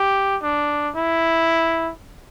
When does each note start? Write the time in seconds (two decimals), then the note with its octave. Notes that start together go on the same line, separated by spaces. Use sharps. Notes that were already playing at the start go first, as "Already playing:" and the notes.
Already playing: G4
0.43 D4
0.95 E4